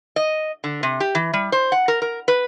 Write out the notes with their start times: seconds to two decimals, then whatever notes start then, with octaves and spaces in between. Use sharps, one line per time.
0.16 D#5
0.64 D3
0.83 C3
1.00 G4
1.15 E3
1.33 G3
1.52 C5
1.72 F#5
1.88 A#4
2.02 A#4
2.28 B4